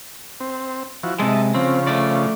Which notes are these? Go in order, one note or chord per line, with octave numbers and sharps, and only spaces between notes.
C4
F3 E4 F#4
C3 G#3 D#5 E5 A5
C#3 F3 C4
A3 D5